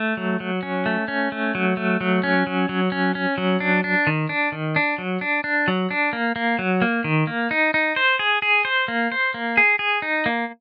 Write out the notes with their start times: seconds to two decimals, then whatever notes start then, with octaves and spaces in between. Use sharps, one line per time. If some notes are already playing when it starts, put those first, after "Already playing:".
Already playing: A3
0.17 F#3
0.40 F#3
0.63 C#4
0.86 A3
1.08 C#4
1.32 A3
1.55 F#3
1.77 A3
2.01 F#3
2.23 C#4
2.47 F#3
2.69 F#3
2.92 C#4
3.15 C#4
3.38 F#3
3.60 D4
3.84 D4
4.07 D#3
4.29 D4
4.52 D#3
4.76 D4
4.98 F#3
5.21 D4
5.44 D4
5.68 F#3
5.91 D4
6.13 A#3
6.36 A#3
6.59 F#3
6.82 A#3
7.04 D#3
7.27 A#3
7.51 D#4
7.74 D#4
7.96 C5
8.19 G#4
8.42 G#4
8.65 C5
8.88 A#3
9.12 C5
9.34 A#3
9.57 G#4
9.79 G#4
10.02 D#4
10.26 A#3